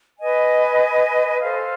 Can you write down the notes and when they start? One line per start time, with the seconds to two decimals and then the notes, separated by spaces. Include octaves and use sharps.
0.19 B4 D#5 G#5
1.39 A4 C5 F5